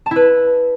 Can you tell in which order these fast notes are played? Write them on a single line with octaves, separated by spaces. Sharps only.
A5 E4 B4